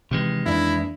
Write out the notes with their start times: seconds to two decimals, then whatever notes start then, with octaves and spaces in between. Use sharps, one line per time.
0.11 D#2 C3 D#3 E3 G#3
0.46 F2 E3 A#3 D4 E4